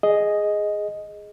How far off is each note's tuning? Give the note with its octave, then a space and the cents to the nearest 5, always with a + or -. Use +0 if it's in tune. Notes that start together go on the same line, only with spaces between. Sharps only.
G#4 +0 D#5 +0